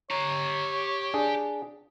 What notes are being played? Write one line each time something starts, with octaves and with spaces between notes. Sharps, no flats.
G4 C#5 A#5
D4 G#4